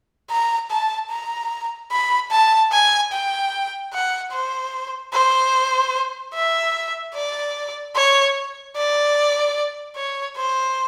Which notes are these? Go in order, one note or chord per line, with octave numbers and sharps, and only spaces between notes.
A#5
A5
A#5
B5
A5
G#5
G5
F#5
C5
C5
E5
D5
C#5
D5
C#5
C5